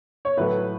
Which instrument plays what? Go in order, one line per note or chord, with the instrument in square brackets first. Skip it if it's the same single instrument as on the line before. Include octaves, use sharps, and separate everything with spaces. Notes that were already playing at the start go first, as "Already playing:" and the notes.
[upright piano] C#5
A2 F#3 A3 B4